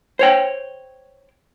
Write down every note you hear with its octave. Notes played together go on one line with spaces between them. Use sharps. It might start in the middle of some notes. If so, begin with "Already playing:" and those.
C5 C#5 G5